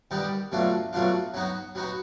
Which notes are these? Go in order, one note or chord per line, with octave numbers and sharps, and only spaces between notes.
D#3 G3 B3 D#4 G4
B2 F#3 A3 D4 F4
B2 F#3 A3 D4 F4
F#3 B3 D#4 F#4
F#3 B3 D#4 F#4